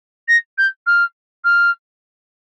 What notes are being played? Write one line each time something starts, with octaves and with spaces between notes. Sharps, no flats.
A#6
G6
F6
F6